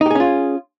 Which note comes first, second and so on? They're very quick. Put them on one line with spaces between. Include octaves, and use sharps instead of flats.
D#4 G4 G#4 C#4 F4